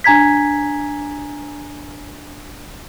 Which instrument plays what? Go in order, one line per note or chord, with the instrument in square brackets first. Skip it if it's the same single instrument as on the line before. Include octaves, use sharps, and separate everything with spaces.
[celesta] D4 G#5 A#5 G#6 B6